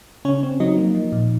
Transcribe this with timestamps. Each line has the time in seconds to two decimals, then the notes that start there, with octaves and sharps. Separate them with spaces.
0.25 C#3 C#4 C#5
0.43 C4
0.60 F#3 D#4 D#5
0.77 A#3
0.95 F3
1.12 A#2